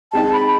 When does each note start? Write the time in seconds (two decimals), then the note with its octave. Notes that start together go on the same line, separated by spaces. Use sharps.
0.12 G#3 C4 D#4 A5
0.33 B5